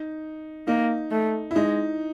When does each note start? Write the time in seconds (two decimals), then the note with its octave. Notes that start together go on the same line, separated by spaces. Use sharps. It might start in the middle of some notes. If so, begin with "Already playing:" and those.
Already playing: D#4
0.67 A#3 D#4
1.12 A3
1.51 E4
1.56 G#3 D#4